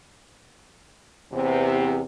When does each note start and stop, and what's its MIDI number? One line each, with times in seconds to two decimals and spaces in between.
1.32 2.01 40
1.32 2.01 48